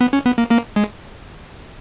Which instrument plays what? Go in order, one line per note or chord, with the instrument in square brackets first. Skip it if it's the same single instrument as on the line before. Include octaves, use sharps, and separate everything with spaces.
[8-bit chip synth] B3
C#4
B3
A#3
A#3
G#3